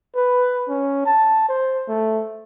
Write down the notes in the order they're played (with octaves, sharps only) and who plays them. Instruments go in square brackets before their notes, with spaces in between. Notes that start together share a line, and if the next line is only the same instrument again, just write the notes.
[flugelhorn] B4
C#4
A5
C5
A3